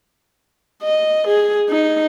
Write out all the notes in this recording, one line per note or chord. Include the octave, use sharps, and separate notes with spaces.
D#5
G#4
D#4